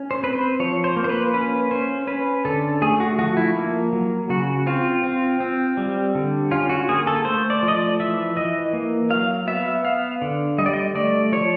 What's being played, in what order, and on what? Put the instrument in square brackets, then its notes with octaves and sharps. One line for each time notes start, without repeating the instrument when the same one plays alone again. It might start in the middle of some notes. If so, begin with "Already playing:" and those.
Already playing: [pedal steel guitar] C#4
C5
C4 B4
C5
F3 C#5
C5
A#3
C5
B4
C#4 B4
C#4 C5
C#4 B4
D3 A4
A3 G#4
F#4
F3 F#4
E4
A#3
F#3
C#3 F#4
C4 F4
C4
C4
G3
D3
C#4 F4
F#4
A#3 G#4
A4
A3 C5
D5
F3
D#5
D5
E3 E5
E3 D#5
A#3
F#3 F5
B3 E5
B3 F5
D3
G3 D#5
D5
D#5
A3 D5
F3 C#5